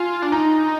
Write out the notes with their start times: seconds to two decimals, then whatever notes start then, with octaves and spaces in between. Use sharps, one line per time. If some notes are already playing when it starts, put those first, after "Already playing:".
Already playing: F4 G#5
0.22 D4
0.32 D#4 A#5